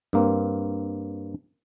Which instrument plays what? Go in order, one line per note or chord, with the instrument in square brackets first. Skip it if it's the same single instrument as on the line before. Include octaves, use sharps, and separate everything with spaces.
[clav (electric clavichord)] G2 A#3 C4